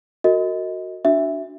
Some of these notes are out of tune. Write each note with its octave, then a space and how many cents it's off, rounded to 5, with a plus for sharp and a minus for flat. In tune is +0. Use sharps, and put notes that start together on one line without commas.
F#4 +0 A#4 -35 D#5 +20
D4 +0 F#4 +0 E5 +0